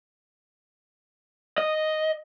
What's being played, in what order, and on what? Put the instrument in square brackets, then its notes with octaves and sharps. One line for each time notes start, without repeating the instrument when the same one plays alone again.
[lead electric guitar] D#5